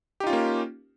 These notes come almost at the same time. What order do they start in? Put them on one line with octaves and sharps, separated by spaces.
G4 D#4 F4 C#4 A#3